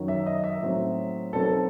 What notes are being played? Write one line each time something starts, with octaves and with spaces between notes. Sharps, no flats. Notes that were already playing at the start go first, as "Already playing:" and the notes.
Already playing: F#2 D#3 F#3
E5
D#5
E5
A2 F#3 C4 D#4
B2 F#3 C4 D#4 A4
A4